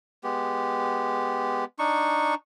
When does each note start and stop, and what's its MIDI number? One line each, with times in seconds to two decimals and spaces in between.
0.24 1.65 56
0.24 1.65 59
0.24 1.65 67
1.79 2.35 62
1.79 2.35 63
1.79 2.35 85